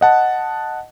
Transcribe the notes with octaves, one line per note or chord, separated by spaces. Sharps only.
D#5 F#5 A5